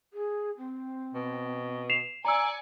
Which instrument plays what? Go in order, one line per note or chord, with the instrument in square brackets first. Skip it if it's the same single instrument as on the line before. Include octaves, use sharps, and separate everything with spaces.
[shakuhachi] G#4
C4
[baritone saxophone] B2
[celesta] C7 E7 F7
[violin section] D5 G#5 C#7 [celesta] A#5 E6